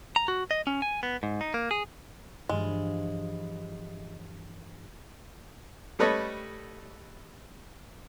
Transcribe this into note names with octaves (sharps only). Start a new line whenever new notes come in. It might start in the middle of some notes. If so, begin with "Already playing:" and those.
A#5
F#4
D#5
C#4
G#5
B3
G#2
D#4
A#3
G#4
G2 E3 F3 G#3
G3 A3 A4 B4 C#5 D#5